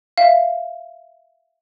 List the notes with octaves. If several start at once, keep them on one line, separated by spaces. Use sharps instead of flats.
E5 F5